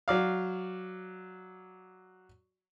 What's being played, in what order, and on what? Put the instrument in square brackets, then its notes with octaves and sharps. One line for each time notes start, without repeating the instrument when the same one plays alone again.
[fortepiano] F#3 D5 F5